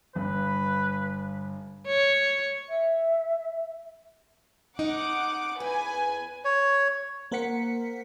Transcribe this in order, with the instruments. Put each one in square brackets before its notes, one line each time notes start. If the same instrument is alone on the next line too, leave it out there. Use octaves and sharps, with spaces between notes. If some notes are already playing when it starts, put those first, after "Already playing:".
[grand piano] G1 G2 [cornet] B4
[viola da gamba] C#5
[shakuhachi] E5
[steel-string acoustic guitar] D#4 [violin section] F#5 D6
[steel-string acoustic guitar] E2 [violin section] B4 G#5
[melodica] C#5
[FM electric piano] A#3 A#4 C5 F#5 B6 C#7